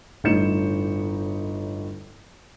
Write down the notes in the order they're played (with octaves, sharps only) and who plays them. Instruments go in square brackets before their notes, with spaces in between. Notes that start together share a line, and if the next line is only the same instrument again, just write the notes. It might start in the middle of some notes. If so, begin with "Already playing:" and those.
[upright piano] G1 A2 D#4 G6 C#7 E7